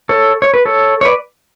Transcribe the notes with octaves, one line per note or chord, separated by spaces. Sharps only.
A4 C#5
C#5
B4
A4 C#5
C#5
B4 D5